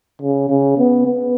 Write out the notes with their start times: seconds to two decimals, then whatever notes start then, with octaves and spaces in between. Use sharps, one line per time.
0.22 C#3
0.50 C#3
0.78 B3
1.06 B3